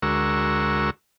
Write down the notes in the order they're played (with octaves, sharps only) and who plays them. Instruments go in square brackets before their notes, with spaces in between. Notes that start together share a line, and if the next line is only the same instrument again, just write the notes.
[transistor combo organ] D2 G#3 F#4 A#4 C#6 E6